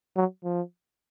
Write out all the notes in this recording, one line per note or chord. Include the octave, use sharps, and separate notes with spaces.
F#3
F3